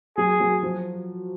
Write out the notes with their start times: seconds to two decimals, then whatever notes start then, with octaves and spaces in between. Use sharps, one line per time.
0.17 F#3 G#4
0.40 F#3
0.63 F3